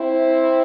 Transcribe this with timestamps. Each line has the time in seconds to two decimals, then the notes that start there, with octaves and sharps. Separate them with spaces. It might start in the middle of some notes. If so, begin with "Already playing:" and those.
Already playing: C4 E4